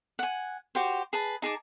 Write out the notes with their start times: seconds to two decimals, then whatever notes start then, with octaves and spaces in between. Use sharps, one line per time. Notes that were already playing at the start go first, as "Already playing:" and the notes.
0.19 F#5 G#5
0.75 F#4 G4 C5
1.13 G#4 B4 A5
1.42 D#4 G#4 A5 D6